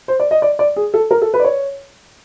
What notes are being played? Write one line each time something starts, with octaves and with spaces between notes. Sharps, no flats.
C5
D5
D#5
D5
D5
G#4
A4
A#4
A4
B4
D5
C#5